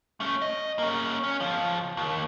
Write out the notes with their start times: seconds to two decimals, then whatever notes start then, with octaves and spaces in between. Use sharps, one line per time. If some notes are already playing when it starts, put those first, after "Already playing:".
0.20 A3 C#4
0.42 D#5
0.79 A#3 C#4
1.24 C#4
1.40 C#2 F3
1.97 D#2